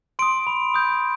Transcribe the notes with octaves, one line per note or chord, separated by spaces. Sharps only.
C6 D#6 D7
B5
D#6 G6